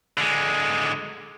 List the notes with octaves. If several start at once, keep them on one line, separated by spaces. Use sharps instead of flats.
D3 G#3